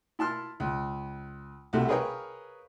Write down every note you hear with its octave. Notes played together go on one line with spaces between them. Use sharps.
E4 A5 C6 F6
C#2
C2 C3 A3 F#4
G#4 A#4 B4 C#5 F5 G5